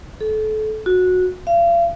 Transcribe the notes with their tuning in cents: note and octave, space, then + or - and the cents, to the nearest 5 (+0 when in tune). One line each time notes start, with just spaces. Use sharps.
A4 -30
F#4 -15
F5 -40